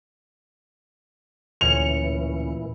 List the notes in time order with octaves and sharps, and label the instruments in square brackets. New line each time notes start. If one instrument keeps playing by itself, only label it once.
[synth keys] D2 C#4 C#7 [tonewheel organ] A#2 E3 [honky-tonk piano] F7